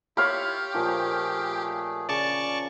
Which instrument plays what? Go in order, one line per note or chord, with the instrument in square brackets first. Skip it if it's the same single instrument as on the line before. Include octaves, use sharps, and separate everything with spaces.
[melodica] E4 F4 [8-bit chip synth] G4 [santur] C#5 F5 B5
[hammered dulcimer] A#2 F3 A#4 [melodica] A3 G#4
[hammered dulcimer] C#3 [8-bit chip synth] D5 A5 C#6